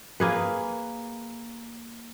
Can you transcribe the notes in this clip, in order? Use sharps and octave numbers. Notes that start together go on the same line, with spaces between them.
A#3 G#4 B4